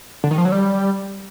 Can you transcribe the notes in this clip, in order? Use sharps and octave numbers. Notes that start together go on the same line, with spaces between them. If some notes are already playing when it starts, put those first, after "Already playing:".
D3
D#3
F3
F#3
G3